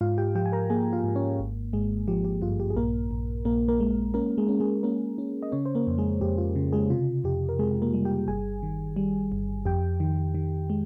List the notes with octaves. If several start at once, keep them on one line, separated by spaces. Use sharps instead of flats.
G#2 F4 F5
G4 G5
F3 G4 G5
G#5
A#4 A#5
A#3 G#4 G#5
F4 F5
G#2
C#4 C#5
G#1
G#1 G#3 G#4
F3 G4
G4
G2 F4
G4
G#4
A#1 A#3 A#4
A#1
A#1 A#3 A#4
A#3 A#4
G#3
A#3 C#4 A#4
G#3 G#4
C#4
G#3 G#4
A#3 C#4 A#4
C#4
D#5
C#3 C#4 C#5
C5
A#3 A#4
F2
G#3 G#4
F2 G4
F4
C#3
G#3 G#4
C3 F4
F2 G4
A#4
C3 G#3 G#4
A#3 A#4
G3
G4 G5
G1 G#4 G#5
D#3
G3
G1
F2 G4 G5
D#3
D#3
G#3